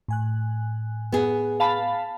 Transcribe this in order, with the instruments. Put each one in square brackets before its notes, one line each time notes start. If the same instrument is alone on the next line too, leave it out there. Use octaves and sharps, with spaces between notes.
[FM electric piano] A2 G#5 F#6
[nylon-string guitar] B3 G#4
[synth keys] F5 A5 B5